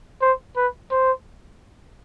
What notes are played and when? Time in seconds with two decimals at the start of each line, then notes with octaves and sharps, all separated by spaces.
0.21 C5
0.56 B4
0.91 C5